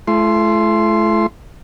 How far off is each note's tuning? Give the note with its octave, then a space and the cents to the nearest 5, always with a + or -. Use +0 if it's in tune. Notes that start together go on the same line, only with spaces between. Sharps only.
A3 -35 E4 +35 C6 +0